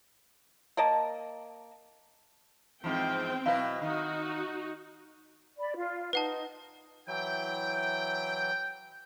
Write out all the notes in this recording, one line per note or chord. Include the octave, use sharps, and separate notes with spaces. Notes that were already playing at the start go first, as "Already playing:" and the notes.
A#3 A#4 D#5 A5
G#2 E3 F3 C4 G5
B2 F#3 E4 B4 F5
D#3 D#4 F#4
D5 B5
F4
D#4 B4 F#5 A5
E3 F#3 E4 G5